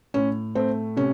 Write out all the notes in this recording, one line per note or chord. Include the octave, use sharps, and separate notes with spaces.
A2 C#4
A3 C4
C3 C#4